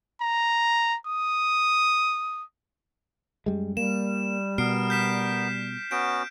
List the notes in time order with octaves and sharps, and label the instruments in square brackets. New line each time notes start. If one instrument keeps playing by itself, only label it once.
[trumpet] A#5
D#6
[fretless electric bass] F#2 G3 G#3
[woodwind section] G3 [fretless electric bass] A#3 [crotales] E7
[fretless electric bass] B2 [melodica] B3 A#4 [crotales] F6 C7 D7
[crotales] G6 B6 E7
[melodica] B3 C#4 F#4 [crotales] G6 D7